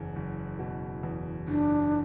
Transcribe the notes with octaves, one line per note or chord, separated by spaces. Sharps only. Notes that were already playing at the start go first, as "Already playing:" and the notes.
Already playing: F#1 E2
F#1
B2
E2
F#1 D4